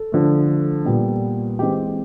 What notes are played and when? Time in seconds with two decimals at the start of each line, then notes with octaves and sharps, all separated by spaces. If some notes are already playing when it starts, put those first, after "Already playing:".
Already playing: A4
0.12 D3 F3 A3
0.85 A#2 G3 B3
1.59 E3 G#3 C4 G4